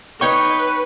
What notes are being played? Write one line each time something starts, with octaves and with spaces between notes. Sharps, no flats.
D#4 B4 C#5 G5 C#6